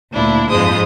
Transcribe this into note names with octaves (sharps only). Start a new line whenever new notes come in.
D2 A#2 D4 E4
F2 G#2 G#3 C5 D#6